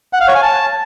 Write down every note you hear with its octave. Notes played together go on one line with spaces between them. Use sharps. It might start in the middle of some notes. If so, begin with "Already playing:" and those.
F#5
F5
C#5
G#5
A5